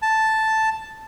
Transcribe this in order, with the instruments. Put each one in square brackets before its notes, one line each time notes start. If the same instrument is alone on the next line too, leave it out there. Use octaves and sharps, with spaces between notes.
[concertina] A5